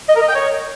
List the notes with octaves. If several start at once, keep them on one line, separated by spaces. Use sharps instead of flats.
D#5
A#4
D#5
G5
C#5